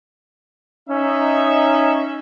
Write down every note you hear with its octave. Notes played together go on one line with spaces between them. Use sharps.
C#4 D#4 E5